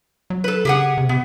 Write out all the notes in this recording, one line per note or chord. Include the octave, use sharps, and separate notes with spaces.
F#3
A4 B4
C#3 G4 G#4 F#5
C3
C3 B3